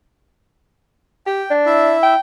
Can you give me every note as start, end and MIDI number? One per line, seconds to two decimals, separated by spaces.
1.27 1.43 67
1.27 1.52 79
1.50 1.94 62
1.66 2.14 64
1.66 2.14 76
2.03 2.20 79